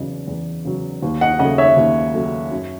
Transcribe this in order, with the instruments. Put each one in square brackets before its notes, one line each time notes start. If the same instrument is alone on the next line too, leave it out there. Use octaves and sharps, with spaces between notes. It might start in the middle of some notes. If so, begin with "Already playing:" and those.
Already playing: [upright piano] E2 C#3 F#3 D#5
E2
C#3 F#3
D#2
D#5 F#5
C#3 F#3 A3 D#5 F#5
C#5 E5
D#2
C#3 F#3 A3
F#2